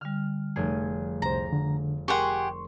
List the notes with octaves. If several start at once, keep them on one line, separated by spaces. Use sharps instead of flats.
D3 G3 F6
F1 A3 G#4
C2 C5 A#5
D3
G4 G#4 A#4 F#5 C6 C#6